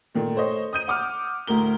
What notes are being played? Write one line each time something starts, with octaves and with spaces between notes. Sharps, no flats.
A#2 D#3 A3
A3 C5 C#5 D#5
D#6 G6 D#7
F#5 D6 F6
D2 A2 A#4 G7